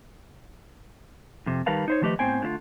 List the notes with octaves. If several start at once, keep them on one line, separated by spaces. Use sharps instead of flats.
F2 C3
D#3 G3 A#4 B4 F5 A5
D#4 C5 C#5
D#3 F3 A3 G4 B4 D#5
A2 B3 C4 C5 G5 G#5
D3 A3 E4 F4